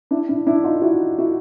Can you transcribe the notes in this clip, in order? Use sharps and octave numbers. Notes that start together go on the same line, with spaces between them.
D4 E4
D4 E4
D4 E4
D#4 F4
E4 F#4
E4 F#4